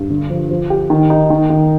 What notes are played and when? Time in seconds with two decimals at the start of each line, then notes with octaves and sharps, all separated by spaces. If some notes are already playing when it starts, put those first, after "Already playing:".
Already playing: G2
0.10 D3
0.30 F3
0.50 F3
0.70 G4
0.90 D#3
1.10 D#4
1.30 D#3
1.50 D#3